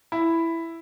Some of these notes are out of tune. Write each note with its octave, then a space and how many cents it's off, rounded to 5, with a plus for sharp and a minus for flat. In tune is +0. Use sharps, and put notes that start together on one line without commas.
E4 +5